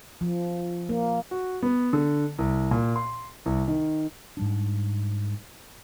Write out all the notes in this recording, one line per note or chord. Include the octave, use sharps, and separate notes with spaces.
F3
A#3
F#4
B3
D3
C2
A#2
C6
C2
D#3
G#2 G3 D4